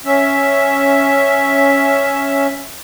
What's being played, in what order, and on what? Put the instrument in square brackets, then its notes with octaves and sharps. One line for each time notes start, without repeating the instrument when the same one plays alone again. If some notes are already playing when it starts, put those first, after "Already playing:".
[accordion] C#4 E5